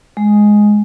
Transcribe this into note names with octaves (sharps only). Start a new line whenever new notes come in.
G#3